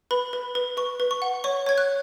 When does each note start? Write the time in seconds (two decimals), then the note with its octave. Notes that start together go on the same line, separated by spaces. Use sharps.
0.11 B4 B5
0.33 B4
0.55 B4
0.77 B4 C#6
1.00 B4
1.11 C#6
1.22 F#5
1.44 C#5 C#6
1.66 C#5 G#6
1.78 F#6